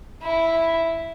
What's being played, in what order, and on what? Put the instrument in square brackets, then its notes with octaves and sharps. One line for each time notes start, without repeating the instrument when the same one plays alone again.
[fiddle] E4